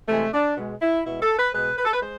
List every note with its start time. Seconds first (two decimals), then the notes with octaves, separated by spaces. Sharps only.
0.08 C3 E3 G#3 A3
0.33 D4
0.57 B2 G#3
0.82 E4
1.06 B2 G#3 E4
1.22 A4
1.38 B4
1.55 B2 G#3 B4
1.78 B4
1.86 A4
1.93 B4
2.02 G#3 C5